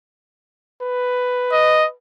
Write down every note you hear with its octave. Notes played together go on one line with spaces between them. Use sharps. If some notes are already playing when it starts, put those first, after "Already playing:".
B4
D#5